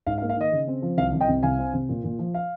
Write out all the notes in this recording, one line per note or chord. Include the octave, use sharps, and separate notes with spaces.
G#2 F5
F5
A#3
F5
D#3 D#5
C#3
C4
F3
C2 F5
C2
D#5 G5
C3
C2 F5 G#5
C4
C3
A#2
A#2
F3
F5